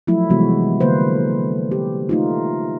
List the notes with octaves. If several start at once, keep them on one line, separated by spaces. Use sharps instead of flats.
F3 F#3 A3 E4
C3 E3 G3 G#3 B3 F#4
D3 A#3 B4 C5
G4
A3 D#4 F4